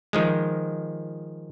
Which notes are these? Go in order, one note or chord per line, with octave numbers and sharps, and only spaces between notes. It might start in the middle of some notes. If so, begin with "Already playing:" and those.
D#3 F3 G#3